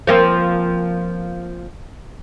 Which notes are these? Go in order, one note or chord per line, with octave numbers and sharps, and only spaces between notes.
F3 A#3 C4